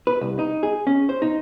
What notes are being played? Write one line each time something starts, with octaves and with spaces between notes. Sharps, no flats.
B4
C2
D#4
G#4
C#4
C5
D#4